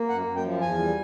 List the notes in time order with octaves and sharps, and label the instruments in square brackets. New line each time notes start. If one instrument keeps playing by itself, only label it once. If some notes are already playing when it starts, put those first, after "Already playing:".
Already playing: [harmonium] A#3
F#2 F#5
F#2
G5
F3
E2 G#5
G3